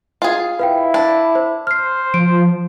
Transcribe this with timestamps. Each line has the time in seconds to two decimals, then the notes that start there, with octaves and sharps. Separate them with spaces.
0.22 F4 G#4
0.59 E4 B4 F5 G5
0.94 D4
1.35 C5
1.67 C5 F6 C7
2.14 F3 D7